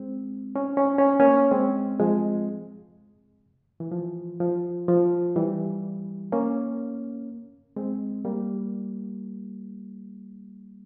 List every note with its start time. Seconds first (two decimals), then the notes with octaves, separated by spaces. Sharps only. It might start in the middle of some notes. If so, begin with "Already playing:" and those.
Already playing: G#3 C4
0.56 C#4
0.77 C#4
0.98 C#4
1.20 A#3 C#4
1.51 G#3 C4
2.00 F3 G#3
3.80 E3
3.92 F3
4.40 F3
4.88 F3
5.36 E3 G3
6.32 A#3 C#4
7.76 G#3 C4
8.25 G3 A#3